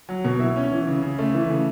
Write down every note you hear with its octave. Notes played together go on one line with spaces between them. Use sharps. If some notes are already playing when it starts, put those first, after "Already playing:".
F#3
B2
E4
C#4
E3
C#3
C#3
A3
E3
C#3